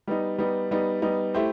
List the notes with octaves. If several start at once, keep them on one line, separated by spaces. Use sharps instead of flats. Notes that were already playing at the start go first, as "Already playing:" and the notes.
G3 B3 D#4
G3 B3 D#4
G3 B3 D#4
G3 B3 D#4
A3 E4 G4 C5